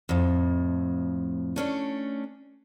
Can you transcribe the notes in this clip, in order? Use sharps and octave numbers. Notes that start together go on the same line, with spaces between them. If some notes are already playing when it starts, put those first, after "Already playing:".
F2 A2
A3 C#4 D4